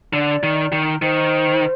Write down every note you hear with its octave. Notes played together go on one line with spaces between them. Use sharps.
D3 D5
D#3
D#3
D#3 C5